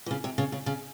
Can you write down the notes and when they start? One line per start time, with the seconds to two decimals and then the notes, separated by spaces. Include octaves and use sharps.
0.06 E3
0.11 C#3
0.24 C3
0.38 C#3
0.52 C#3
0.66 C#3